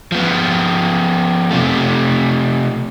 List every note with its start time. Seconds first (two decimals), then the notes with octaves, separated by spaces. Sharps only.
0.12 F3 B3
1.51 C3 A3